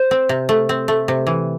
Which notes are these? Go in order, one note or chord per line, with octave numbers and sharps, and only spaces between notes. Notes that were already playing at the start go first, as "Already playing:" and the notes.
Already playing: C5
C4
C3
A3
C4
A3
C3
E3